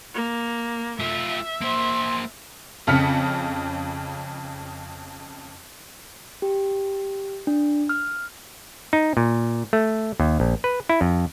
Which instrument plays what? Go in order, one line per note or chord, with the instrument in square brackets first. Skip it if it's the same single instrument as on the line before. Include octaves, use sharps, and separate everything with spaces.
[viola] A#3
[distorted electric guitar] A3 F4 [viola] E5
[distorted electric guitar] A#3 C5 [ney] C6
[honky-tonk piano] F2 C#3 F6 B6 C#7
[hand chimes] G4
D4
F6
[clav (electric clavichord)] D#4
A#2
A3
D#2
A#1
B4
E4
F2